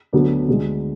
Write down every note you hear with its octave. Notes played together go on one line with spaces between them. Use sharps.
D2 D3 F#3 B3 D4
D2 D3 G#3